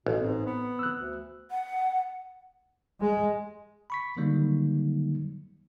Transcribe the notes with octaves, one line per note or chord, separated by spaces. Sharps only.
A1 B2
G#2 C4
B3
E6 F#6
D2
F#5
G#3
B5 C#6 B6
D3 D#3 F#3 G3 A#3 D#4